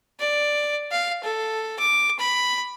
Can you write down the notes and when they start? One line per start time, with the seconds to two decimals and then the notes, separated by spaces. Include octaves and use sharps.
0.20 D5
0.91 F5
1.24 A4
1.79 D6
2.19 B5